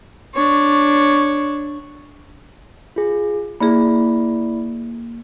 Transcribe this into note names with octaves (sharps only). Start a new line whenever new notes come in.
D4 C#5
F4 G#4
A#3 E4 G#4 D5 B5